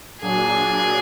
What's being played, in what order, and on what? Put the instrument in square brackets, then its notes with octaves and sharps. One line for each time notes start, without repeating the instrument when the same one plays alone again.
[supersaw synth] A#2 F#3 D4 [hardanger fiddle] G#4